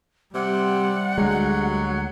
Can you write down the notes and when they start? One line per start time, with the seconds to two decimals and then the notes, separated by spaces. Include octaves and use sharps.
0.35 C3 G3 F#5
1.18 D2 F#3 G#3